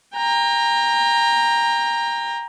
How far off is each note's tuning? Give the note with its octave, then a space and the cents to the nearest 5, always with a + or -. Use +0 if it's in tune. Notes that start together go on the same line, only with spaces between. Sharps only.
G5 +30 A#5 +0